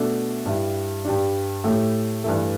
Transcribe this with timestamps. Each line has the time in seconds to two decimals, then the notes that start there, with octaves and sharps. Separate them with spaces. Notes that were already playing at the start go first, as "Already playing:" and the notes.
Already playing: B2 A3 D4 A4
0.45 G2 G3 E4
1.05 G2 G3 D4
1.64 A2 A3 G4
2.24 G2 E3 A3